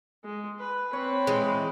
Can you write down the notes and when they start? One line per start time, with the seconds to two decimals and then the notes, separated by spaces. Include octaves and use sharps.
0.24 G#3
0.60 B4
0.93 C4 B4 C#5
1.27 E3 G#3